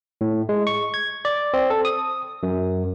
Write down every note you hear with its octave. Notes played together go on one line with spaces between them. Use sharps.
A2
G#3
C#6
G#6
D5
C4
A4
D#6
F#2